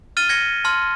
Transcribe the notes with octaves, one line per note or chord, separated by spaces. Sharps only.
F6 A6 D#7 G7
G#6 A#6 C#7 G7
A5 C6 F6